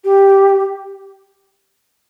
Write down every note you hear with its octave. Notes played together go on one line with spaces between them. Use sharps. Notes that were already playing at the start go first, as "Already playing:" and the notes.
G4